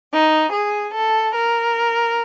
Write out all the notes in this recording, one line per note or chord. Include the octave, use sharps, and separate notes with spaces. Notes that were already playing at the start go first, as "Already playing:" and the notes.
D#4
G#4
A4
A#4